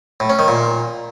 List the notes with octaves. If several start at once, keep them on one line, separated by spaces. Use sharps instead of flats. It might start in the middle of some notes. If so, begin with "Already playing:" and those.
A2
C#4
D#3
A#2